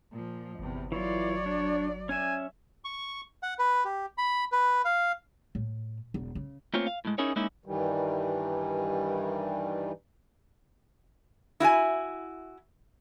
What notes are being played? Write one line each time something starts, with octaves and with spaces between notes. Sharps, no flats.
A#2 F3
G1 E2 C3
E3 F#3 F4 C#5 D5
D4
C#4 E5 G#5
C#6
F#5
B4
G4
B5
B4
F5
A2
E1
C#3
A3 A#3 C4 C#4 F4 C#5
F5
A2 G#3
C#4 D#4 E4 G#4 A#4 C#5
G#3 A#3 C#4 D#4 E4
G2 D#3 E3 G3
E4 F#4 F5 G#5